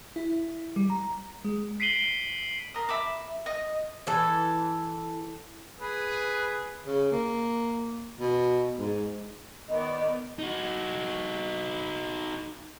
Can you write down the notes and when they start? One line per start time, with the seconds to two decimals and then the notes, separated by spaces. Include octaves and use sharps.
0.16 E4
0.76 G3
0.90 A#5
1.45 G#3
1.80 B6 C7 D7 D#7 F#7 G7
2.74 A#4 D#6
2.89 E5 B5 D6
3.46 D#5
4.07 E3 A4
5.80 G#4 B4
6.87 C#3
7.12 A#3
8.20 B2
8.78 G#2
9.69 D#3 B3 D5 D#5
10.39 D#4 F#4